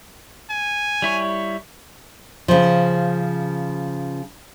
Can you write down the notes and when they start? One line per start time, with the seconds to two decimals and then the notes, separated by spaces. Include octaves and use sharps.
0.50 G#5
1.02 G3 E4 C#5
2.48 C#3 F3